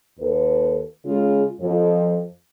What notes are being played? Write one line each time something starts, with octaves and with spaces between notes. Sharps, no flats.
D#2 A4 B4
C#3 G#3 F4 G#4
F2 F3